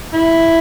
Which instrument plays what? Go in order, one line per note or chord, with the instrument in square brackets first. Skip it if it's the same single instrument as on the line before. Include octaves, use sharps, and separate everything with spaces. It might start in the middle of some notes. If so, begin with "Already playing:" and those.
[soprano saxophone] E4